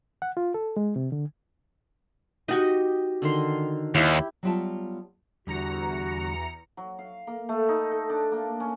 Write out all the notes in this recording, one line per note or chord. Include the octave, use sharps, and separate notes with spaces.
F#5
F4
A4
G#3
C3
D3
D#4 F#4 G4 D#5
D3 D#3 C6
D#2 E4 G4
F#3 G3 B3 F4 E5 A5
E2 D3 G3 F#4 A#5 C#7
F#3
F5
A#3
A3
D#4
A4
D4
A#3
C#4